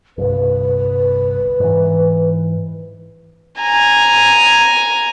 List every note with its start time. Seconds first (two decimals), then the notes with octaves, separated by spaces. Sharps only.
0.18 G1 C2 B4
1.60 G#2 E3
3.61 G#5 A#5